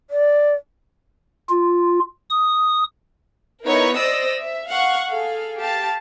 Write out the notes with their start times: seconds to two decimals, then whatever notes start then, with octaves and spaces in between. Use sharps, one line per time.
0.10 D5
1.49 F4
2.30 D#6
3.65 B3 D#4 E4 A#4 B4 C#5
3.95 C5 D5 D#5 D#6 E6 A#6
4.37 E5
4.69 F5 F#5 C#6
5.09 G#4 A4 F5
5.58 G4 F5 A5